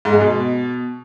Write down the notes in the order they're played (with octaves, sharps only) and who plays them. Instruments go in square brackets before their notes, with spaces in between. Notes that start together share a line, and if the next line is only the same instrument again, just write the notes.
[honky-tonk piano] G#2
G#3
B2